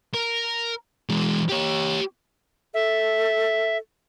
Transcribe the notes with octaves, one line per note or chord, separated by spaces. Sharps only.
A#4
E3 G#3
G4 C#5
A4 E5